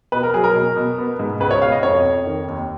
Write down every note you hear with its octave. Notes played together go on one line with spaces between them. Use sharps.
B2 B4
A#4
F#3 G#4
A#4
B2
B2
B3
G#2
C#2 B4
C#5
B2 F5
D#5
F2 C#5
F2
D#3
D#2